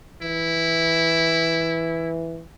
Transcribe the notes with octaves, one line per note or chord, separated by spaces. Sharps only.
E3 E4